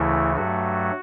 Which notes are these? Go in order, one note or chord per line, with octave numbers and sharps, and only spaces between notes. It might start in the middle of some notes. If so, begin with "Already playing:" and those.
Already playing: D2 C#3 E3 A3 E4
G2 F#3 A3 F#4